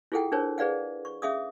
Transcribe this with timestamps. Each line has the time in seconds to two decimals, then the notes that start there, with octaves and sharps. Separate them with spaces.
0.12 E4 F4 G#4 A4 F#5 G5
0.32 D4 G#4 A#4 C5 C#5
0.58 G#4 B4 D5 F5 F#5
1.05 C#6
1.22 C#4 G#4 E5 F5 D6 D#6